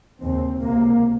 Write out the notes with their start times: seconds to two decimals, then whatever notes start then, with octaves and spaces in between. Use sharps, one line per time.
0.21 D#2 C#3 C4
0.61 C#2 C3 A#3